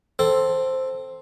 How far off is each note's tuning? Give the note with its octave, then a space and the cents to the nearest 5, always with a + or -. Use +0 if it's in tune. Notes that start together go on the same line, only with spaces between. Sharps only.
C4 +0 A4 +0